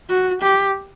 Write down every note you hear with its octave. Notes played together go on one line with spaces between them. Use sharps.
F#4
G4